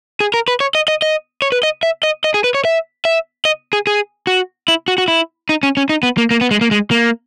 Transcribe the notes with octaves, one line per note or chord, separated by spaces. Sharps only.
G#4
A#4
B4
C#5
D#5
D#5
D#5
C#5
B4
D#5
E5
D#5
D#5
G#4
B4
C#5
E5
E5
D#5
G#4
G#4
F#4
E4
F#4
F#4
E4
D#4
C#4
C#4
D#4
B3
A#3
A#3
B3
G#3
A#3
G#3
A#3